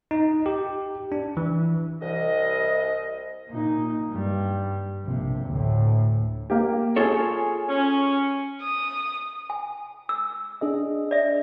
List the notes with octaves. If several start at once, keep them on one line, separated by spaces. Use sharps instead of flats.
D#4
G4
D4
E3
C2 D#5
A#2 D#4
G2 G3
A#1 C3
D2 A2
A#3 G4
F4 G#4 A4 C#5 G#5
C#4
D#6
G#5
E6
D4 G#4 D#5
D5 E5